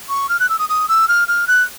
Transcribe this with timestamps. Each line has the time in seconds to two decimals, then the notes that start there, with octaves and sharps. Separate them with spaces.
0.09 C#6
0.29 F6
0.40 F#6
0.49 E6
0.59 D#6
0.69 D#6
0.89 E6
1.08 F6
1.28 F6
1.47 F#6